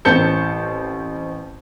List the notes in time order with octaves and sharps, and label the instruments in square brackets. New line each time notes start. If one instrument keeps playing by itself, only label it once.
[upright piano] A1 C4 A5 G6 C#7